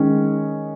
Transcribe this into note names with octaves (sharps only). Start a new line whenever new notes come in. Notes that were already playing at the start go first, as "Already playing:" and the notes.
Already playing: D#3 G#3 C#4